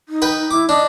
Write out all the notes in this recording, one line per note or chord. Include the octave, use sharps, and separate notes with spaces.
D#4
B4 G5
E4 D6
D4 D#5